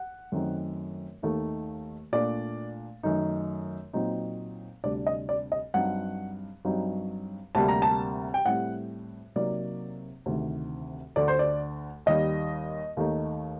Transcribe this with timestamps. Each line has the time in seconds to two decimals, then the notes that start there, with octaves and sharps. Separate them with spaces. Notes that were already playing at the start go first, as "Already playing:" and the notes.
Already playing: F#5
0.32 F#2 D#3 A3 C4 D#4
1.22 D#2 D#3 A3 D#4
2.13 A#2 A3 D4 D5
3.03 F#2 D#3 A3 D#4
3.93 A#2 F#3 C4 D#4
4.84 D2 C3 G3 D4 D5
5.06 D#5
5.29 D5
5.52 D#5
5.74 G2 F#3 C4 D#4 F#5
6.65 G2 F#3 C4 D#4
7.55 D2 C3 G3 A#3 A5
7.69 A#5
7.82 A5
8.34 G5
8.46 A2 G3 C4 F#5
9.36 C3 F#3 A#3 D#4 D5
10.26 D2 C3 D#3
11.16 D2 D3 A3 D5
11.28 C5
11.39 D5
12.06 D#2 D#3 G3 D#5
12.97 D#2 D#3 A3 D#4